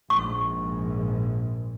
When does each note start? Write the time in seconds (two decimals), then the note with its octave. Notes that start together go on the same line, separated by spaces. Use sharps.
0.10 A#1 G#2 C#6